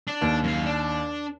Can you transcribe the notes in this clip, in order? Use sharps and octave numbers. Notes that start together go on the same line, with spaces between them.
D4
D#2
F#2 F5
D4